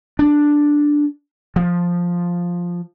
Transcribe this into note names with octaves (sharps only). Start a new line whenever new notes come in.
D4
F3